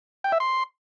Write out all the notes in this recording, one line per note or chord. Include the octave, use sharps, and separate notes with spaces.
G5
E5
C6